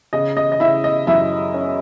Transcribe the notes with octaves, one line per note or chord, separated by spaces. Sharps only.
C#3 D#5
D#5
D#5
C#3 E4 E5
D#5
F#2 E4 E5
C#4